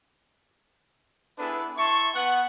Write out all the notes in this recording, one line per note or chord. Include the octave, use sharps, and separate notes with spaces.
B3 D4 E4 G#4 A4 B4
E4 E5 A5 C6 C#6
B3 F#5